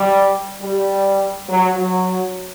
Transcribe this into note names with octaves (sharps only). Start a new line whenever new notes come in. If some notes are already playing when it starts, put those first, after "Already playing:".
Already playing: G3
G3
F#3
F#3